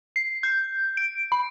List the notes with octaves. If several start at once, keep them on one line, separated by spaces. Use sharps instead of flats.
C7
G6
D7
B5